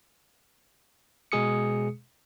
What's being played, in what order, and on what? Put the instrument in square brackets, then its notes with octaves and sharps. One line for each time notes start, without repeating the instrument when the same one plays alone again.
[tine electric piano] B2 G#3 G#4 D#6 C#7